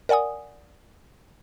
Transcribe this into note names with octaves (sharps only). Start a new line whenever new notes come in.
A#4 D5 F#5 G#5 D#6